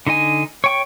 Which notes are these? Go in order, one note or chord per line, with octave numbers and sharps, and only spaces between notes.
D3 D#4 D#5 G#5
C#5 G5 C#6